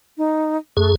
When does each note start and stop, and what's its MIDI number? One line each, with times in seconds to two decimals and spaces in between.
0.18 0.57 63
0.77 0.95 42
0.77 0.91 57
0.77 0.95 68